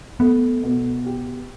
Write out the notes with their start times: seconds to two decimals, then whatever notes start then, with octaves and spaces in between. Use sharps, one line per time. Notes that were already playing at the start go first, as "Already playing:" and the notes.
0.20 A3 B3
0.63 B2
1.06 G4